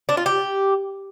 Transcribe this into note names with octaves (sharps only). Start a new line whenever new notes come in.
D4
F4
G4